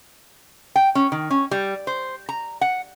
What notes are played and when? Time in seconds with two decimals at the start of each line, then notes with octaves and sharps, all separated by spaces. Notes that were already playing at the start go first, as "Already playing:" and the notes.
0.76 G5
0.95 C#4
1.12 D#3
1.30 C#4
1.51 G3
1.87 C5
2.29 A#5
2.61 F#5